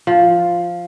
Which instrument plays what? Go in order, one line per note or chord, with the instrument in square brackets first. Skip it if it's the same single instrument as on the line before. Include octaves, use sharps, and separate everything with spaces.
[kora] F3